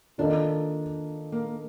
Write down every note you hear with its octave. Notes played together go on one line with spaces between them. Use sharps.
D#3 A#3 D4 F4 A4 D#5
A#3